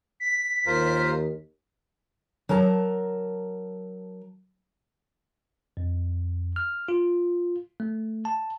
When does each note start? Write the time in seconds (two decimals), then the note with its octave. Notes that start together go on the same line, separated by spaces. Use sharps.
0.20 B6
0.66 D#2 F4 A#4 C5
2.49 F#3 A#4 A5 A#5
5.77 F2
6.56 F6
6.88 F4
7.80 A3
8.25 A5